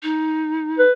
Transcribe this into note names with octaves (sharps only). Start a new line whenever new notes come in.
D#4
B4